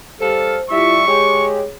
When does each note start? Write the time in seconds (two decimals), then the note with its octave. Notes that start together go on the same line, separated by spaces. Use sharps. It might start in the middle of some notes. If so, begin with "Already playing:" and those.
0.20 G3 A4 C5 F5
0.70 G3 E4 F4 E5 C#6
1.07 G#3 G4 G#4 C#5